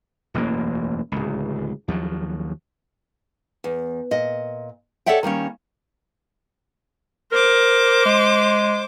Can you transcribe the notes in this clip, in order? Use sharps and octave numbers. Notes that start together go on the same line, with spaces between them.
E1 A1 F#2 A#3
D1 C#2
D#2 F3 F#3
E2
A#2 D#5
A4 C#5 D5 E5 F#5 G5
D#3 G3 A#3 C#4
A#4 C5 D6
G#3